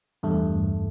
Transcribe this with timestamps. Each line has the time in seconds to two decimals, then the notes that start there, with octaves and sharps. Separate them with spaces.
0.23 E2 G2 A3